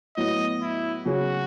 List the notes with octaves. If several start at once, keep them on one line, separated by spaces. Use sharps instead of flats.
A2 F#3 B3 D#5
E4
C#3 F#3 C#4 F#4 G#4